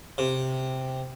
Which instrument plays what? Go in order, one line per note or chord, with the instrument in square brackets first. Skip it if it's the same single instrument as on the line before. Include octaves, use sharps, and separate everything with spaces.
[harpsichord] C3